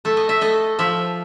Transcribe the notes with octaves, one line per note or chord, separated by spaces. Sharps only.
A3 E5
D#5
E5
A3 D#5
F3 E5